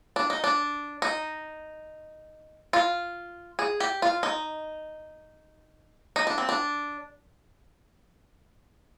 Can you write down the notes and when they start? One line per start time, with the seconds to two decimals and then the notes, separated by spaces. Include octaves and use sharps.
0.16 D4
0.30 D#4
0.44 D4
1.02 D#4
2.73 F4
3.59 G#4
3.80 G4
4.02 F4
4.23 D#4
6.16 D#4
6.27 D4
6.38 C4
6.49 D4